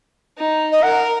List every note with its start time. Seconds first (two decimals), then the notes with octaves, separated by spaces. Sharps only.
0.38 D#4
0.72 D#5
0.83 A#4 F#5